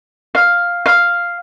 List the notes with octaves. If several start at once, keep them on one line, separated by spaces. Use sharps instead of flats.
F5
F5